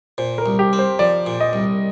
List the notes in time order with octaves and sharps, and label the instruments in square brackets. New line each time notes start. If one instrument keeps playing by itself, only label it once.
[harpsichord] A#2 [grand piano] C5
[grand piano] A#4
[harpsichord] C2
[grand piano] G4
[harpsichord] C4
[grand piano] C5
[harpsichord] F3 [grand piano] D5
[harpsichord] A#2
[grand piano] D#5
[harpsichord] C2